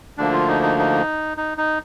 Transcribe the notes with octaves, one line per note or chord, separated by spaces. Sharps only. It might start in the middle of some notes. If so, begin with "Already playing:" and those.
D2 D3 F3 A#3 D4
F4
D#4
D#4
D#4
D#4
D#4